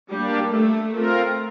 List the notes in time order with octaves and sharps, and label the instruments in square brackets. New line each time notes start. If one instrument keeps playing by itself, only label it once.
[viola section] G3 [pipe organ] A#3 D4 G4
[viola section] A3
[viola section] A3 [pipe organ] C4 F4 A#4